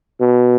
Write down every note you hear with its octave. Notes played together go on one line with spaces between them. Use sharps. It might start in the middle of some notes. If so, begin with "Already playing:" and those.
B2